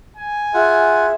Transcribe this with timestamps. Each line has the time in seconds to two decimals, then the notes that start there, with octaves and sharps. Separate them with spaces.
0.17 G#5
0.54 F4 G#4 E5 F#5